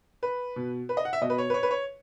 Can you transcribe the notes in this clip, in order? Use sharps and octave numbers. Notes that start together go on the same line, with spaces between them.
B4
B2
B4
D#5
F#5
E5
B2 D#5
B4
C#5
B4
C#5
B4
C#5